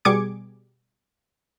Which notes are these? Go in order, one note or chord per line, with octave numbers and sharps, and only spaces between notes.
B2 G3 G#4 D6 G#6 C#7